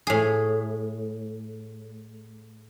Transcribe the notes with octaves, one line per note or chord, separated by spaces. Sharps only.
A2 G#4